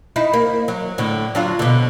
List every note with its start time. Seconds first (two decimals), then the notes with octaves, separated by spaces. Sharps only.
0.16 D#4 E4
0.33 A#3
0.68 F#3
0.98 A2 D3
1.35 F#3 D4 F4
1.59 B2 D3